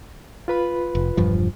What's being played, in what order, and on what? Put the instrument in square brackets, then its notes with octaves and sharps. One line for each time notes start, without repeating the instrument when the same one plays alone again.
[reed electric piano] F4 B4 B5
[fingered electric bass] F1
E1 G2 F3